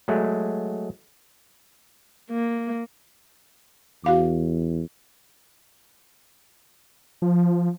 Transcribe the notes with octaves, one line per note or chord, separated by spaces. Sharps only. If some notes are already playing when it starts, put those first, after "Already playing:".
F#3 G#3 A3
A#3
E2 F#4 F5 D6
F3